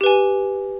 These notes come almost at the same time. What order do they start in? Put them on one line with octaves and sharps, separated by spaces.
G4 B4 G#5